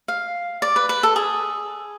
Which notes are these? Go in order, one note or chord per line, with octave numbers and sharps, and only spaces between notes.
F5
D5
B4
B4
A4
G#4